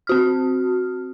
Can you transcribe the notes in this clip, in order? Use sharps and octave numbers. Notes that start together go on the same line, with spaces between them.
C4 F#4 F6